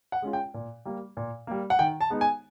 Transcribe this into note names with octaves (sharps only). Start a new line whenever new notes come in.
F#5
G#3 C#4 F4
G5
A#2
G3 A#3
A#2
G3 A#3
F#5
D#3 G5
A5
G#3 B3 D#4
G#5